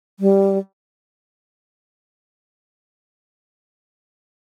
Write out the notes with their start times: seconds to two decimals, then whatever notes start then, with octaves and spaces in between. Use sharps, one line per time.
0.20 G3